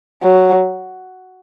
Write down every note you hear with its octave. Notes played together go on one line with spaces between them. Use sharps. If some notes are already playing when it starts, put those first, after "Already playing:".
F#3